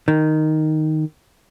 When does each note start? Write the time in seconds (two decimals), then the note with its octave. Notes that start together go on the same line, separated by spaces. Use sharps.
0.08 D#3